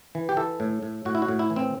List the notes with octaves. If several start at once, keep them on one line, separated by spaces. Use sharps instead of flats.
E3
G4
E3 A4
A2
A2
A2 F#4
E4
F#4
A2
E4
E3
C4